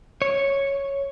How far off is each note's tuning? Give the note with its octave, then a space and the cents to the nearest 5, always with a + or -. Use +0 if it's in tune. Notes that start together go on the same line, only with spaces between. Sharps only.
C#5 -5